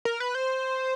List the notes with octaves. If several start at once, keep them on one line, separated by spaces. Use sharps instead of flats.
A#4
B4
C5